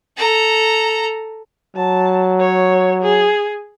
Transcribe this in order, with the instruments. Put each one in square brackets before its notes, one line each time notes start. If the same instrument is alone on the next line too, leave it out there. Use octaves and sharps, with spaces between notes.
[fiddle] A4 A#5
[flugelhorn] F#3 [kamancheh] A5
[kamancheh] C#5
G#4